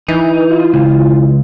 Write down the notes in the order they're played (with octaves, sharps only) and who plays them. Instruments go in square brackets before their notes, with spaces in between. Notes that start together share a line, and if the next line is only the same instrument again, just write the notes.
[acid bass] E3 [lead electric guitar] D#4
[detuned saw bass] F4
[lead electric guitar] C#2